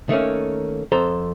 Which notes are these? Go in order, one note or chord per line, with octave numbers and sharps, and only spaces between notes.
D#3 A3 A#3 C#4
F2 A4 C5 A#5